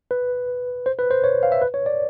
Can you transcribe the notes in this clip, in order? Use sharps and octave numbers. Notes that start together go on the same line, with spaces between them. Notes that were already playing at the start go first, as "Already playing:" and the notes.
B4
C5
B4
C5
C#5
F5
E5
B4
C#5
D5